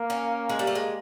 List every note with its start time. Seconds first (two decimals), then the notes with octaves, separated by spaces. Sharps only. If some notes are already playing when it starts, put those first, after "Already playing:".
Already playing: A#3
0.10 C#4
0.49 G#3
0.59 G3
0.67 A3
0.75 G#3